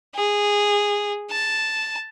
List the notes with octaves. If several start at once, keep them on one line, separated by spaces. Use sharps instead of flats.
G#4
A5